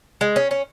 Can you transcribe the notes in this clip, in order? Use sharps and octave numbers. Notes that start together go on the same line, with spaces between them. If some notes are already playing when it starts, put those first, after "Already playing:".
G#3
C#4
C#4